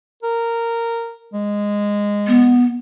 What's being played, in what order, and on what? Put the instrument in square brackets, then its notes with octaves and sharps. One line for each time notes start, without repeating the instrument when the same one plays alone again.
[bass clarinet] A#4
G#3
[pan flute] B3